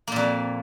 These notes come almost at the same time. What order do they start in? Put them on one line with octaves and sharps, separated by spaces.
A#3 A#2 F2